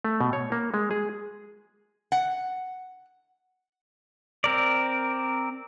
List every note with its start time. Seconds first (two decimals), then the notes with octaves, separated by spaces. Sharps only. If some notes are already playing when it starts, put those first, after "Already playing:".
0.05 A3
0.21 B2
0.33 C#5
0.52 A#3
0.74 G#3
0.91 G#4
2.12 F#5
4.44 C4 A#4 D5